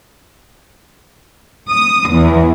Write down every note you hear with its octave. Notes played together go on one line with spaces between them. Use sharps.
D#6
E2